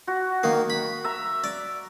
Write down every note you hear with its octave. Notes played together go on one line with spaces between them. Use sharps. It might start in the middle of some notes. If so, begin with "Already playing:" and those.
F#4
D#3 A#3
B5
E5 A#5
D5